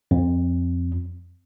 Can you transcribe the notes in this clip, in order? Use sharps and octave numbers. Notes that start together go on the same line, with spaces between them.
F2